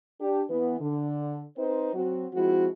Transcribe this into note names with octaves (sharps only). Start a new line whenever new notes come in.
D4 G4
E3 B3
D3
C4 D#4 B4 C5
F#3 C4 F#4
F3 G#3 C4 E4 F#4